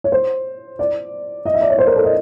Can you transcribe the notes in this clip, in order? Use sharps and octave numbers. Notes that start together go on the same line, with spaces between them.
C#5
C5
D5
D#5
E5
D5
C#5
C5
A#4
A4
D#5